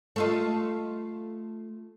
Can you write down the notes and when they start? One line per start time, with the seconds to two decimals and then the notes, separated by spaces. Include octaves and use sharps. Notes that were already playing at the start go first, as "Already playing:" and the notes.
0.16 A3 F4 D#5